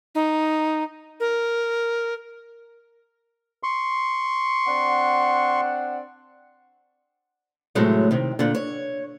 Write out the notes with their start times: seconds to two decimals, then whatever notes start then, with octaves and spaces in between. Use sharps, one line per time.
0.15 D#4
1.20 A#4
3.63 C6 C#6
4.66 C4 D4 F#5
7.75 A2 C3 F#3 G#3 A3
8.11 C3 D#3
8.39 A#2 D3
8.55 C#5